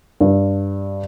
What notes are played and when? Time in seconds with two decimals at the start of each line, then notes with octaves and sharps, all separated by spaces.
0.20 G2